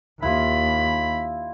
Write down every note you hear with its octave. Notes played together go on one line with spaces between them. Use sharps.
D#2 E4 F4 D#5 B5